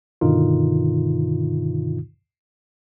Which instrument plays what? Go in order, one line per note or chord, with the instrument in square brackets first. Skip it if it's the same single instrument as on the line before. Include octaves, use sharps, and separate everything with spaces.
[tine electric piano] G2 B2 D3 D#3 D#4 F4